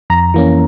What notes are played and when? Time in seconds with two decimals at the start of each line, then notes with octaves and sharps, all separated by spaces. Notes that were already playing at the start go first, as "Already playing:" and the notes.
0.10 F2 A#5
0.34 E3 A#3 C#4